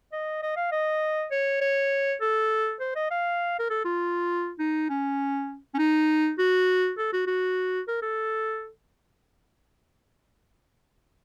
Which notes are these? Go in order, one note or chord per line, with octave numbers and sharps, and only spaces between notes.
D#5
D#5
F5
D#5
C#5
C#5
A4
C5
D#5
F5
A#4
A4
F4
D#4
C#4
C#4
D#4
F#4
A4
F#4
F#4
A#4
A4